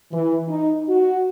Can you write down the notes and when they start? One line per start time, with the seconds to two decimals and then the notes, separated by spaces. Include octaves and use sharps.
0.12 E3
0.48 D#4
0.88 F#4